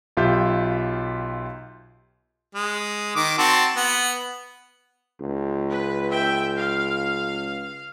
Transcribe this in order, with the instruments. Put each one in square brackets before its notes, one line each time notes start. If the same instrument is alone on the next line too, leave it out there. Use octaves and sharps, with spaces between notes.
[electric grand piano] B1 F4 G4 E5 G6
[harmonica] G#3
D#3 D6
C4 F#4 A5
B3
[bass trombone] C#2
[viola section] B4
E5 G5
F5